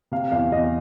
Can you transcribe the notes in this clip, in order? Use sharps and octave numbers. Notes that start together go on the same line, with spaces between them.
C3 F5
E2 F5
E2 D#5